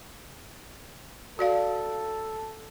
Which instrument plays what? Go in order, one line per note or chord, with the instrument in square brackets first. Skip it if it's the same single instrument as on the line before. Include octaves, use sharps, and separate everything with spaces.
[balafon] F#4 D5 F5 [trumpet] A4